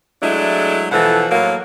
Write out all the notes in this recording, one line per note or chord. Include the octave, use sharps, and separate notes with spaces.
F#3 G#3 A3 D4 E4
B2 E3 F3 A4 F#5
A2 F#3 A#3